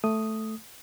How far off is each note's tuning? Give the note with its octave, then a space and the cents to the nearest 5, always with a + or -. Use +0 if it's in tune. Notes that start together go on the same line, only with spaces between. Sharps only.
A3 +0 D#6 +0